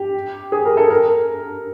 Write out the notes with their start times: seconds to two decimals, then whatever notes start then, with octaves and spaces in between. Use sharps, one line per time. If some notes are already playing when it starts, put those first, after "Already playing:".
Already playing: G4
0.52 G#4
0.65 A#4
0.77 A4
0.90 A#4